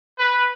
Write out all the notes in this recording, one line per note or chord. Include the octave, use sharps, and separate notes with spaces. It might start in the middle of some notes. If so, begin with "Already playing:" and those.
B4